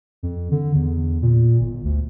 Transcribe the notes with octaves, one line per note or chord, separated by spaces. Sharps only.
F2
D3
E2
A#2
G1
D2